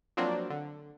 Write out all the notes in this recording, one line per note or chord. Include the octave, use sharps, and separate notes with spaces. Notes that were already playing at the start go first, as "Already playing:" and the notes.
F3 F#3 A#3 C4 D4
D3